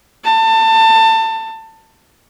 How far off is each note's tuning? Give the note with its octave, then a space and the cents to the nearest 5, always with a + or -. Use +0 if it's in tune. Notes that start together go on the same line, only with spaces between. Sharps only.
A5 +25